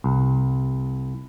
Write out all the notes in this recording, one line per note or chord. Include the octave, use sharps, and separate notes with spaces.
C2